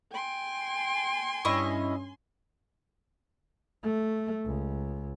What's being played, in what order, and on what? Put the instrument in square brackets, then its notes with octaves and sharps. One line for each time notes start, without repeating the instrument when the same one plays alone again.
[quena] G5 [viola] G#5 C6
[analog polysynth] G2 C#4 [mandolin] E4 D#5 C#6
[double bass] A3
C#2